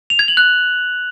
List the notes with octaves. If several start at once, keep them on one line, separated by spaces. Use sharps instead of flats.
F7
G#6
F#7
F#6